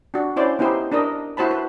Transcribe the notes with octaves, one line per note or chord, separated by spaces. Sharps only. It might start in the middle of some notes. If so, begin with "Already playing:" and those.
D4 F#4
C#4 E4 C5 D5
B3 D#4 E4 G4 C5
D4 D#4 A#4 D#5
E4 F#4 C5 A5 B5
B4